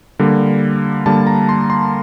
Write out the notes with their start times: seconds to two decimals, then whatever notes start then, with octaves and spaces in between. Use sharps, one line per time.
0.19 D3 G3 A#3
1.06 D3 G3 A#3 A5
1.27 A#5
1.49 C6
1.70 C6